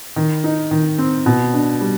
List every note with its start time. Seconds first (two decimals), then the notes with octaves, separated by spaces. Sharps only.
0.16 D#3
0.44 D#4
0.71 D#3
0.98 C4
1.26 B2
1.54 D4
1.81 G3